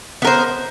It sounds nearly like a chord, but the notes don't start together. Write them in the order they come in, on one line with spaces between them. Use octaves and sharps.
B3 A#4 C5